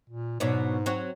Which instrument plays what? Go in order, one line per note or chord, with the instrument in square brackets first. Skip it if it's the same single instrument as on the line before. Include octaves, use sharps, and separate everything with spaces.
[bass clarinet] A#2
[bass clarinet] G#2 [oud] B2 F#3 D4
[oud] F#3 C4 F#4